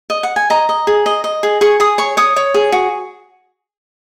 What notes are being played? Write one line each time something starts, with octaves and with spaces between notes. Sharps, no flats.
D#5
F#5
G#5
D#5 A#5
D#5
G#4
D#5
D#5
G#4
G#4 C#6
G#4 D#6
C#5 C#6
C#5 D#6
C#5
G#4
F#4